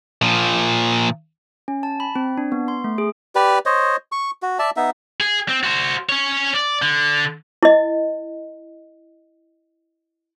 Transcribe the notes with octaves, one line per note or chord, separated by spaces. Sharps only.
A#2 F3
C#4
A5
B5
C4
D4
B3
C6
A3
G#4
G4 B4 D5
C5 C#5 D#5
C#6
F#4
D5 E5 A5
B3 D#4 E5
G#4
C4
F#4 C5
C#4 C#5
D5
D3
E4 D#5